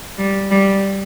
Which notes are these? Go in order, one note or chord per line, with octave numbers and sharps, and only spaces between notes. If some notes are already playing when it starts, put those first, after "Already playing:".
G3
G3